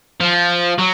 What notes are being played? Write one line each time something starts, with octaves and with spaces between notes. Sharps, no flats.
F3
F#3